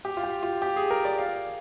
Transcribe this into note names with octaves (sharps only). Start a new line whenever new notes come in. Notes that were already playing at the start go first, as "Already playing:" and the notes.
G4
F4
G4
F4
G4
G#4
A#4
D5
F5